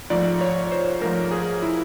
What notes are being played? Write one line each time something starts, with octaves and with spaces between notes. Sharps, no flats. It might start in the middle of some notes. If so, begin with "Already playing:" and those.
G#2 F3 A3 D5
C#5
C5
G#2 F3 A3 A#4
G#4
E4